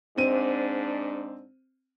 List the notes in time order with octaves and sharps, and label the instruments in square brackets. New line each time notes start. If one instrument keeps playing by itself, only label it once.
[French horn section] G#2 D4 [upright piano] C4 D#7